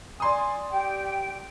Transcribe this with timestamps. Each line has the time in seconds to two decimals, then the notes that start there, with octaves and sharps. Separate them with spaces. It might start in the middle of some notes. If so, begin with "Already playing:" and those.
0.20 D5 G#5 C6 D#6
0.73 G4 G5